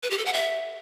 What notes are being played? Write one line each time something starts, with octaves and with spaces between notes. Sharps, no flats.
B4
G4
A4
F#5
E5